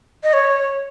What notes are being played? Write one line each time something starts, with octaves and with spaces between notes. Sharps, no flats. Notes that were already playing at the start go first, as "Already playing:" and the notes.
D#5
C#5